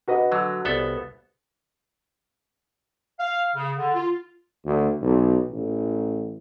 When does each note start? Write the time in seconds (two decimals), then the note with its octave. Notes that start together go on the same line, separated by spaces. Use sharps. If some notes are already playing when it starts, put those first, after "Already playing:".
0.08 F#4 B4 D#5
0.32 D3 F#3
0.65 C2 B3 A4
3.19 F5
3.56 C#3
3.77 D3
3.95 F4
4.65 D2
5.02 B1
5.51 A1